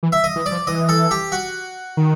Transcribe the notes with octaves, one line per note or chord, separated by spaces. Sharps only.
E3
E5
D#5
E3
D5
F3
E3 D#5
A4
G4
F#4
D#3